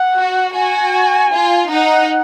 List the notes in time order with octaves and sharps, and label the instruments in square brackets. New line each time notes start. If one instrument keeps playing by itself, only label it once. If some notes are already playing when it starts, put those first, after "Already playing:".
Already playing: [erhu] F#5
[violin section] F#4
[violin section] F#4 [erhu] G#5
[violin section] F4
[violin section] D#4 [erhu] F#5